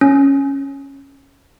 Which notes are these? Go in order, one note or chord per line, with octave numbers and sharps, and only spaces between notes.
C#4